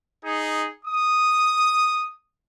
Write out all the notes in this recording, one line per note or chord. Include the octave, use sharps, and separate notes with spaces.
D#4 G#4
D#6